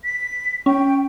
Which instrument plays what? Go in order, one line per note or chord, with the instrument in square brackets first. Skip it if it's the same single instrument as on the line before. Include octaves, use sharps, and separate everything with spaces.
[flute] B6
[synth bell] C#4 [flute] G5